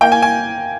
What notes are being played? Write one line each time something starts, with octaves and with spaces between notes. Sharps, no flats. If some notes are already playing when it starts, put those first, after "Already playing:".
A#3 G5
G#5
G#5